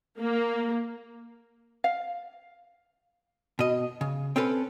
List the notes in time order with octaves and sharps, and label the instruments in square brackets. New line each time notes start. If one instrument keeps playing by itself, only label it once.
[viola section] A#3
[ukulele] F5
[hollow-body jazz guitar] B2 D#5
C#3
C4 C#4 A4 B4